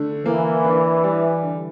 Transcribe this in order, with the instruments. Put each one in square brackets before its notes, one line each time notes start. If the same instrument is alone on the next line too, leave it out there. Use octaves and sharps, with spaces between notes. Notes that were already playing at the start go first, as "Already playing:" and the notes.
Already playing: [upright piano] D3 A3
[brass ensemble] E3 [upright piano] A#3
[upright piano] D4
G3
D3